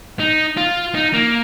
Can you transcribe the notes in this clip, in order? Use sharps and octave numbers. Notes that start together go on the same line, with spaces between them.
D#4
F4
D#4
A#3